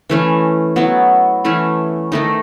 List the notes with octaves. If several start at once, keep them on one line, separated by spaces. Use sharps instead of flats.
E3 A3 C#4
F#3 B3 E4
E3 A3 C#4
D#3 A3 D#4